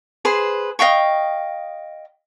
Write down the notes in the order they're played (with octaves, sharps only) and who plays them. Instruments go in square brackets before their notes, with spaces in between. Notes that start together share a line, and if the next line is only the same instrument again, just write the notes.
[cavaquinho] G#4 B4 C5
D#5 F5 G5 C#6